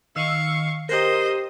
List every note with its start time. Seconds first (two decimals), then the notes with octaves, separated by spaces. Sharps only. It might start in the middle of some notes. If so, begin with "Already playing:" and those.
0.16 D#3 F5 C#6 E6
0.89 G4 A#4 C5 D#5